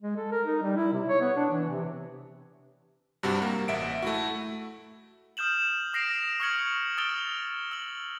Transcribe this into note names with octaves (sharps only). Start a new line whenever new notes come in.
G#3
A4
A#4
D#4
G3
E4
C3
C#5
B3
D4
E3
C3
G2 C3 G3 F#4
A#3
A1 E5 F#5 D7
A3 E4 F#4
D#6 F6 G6 E7 F#7
D#6 A#6 C7 D7 F7
C#6 D#6 F6 G#6 C#7 F#7
D#6 E6 A6 D7 F7 G7
E6 F#7